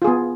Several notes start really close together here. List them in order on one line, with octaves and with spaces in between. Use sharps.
F4 G#4 B3